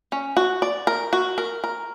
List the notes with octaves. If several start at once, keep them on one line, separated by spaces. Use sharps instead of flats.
C#4
F#4
D5
A#4
F#4
A#4
A#4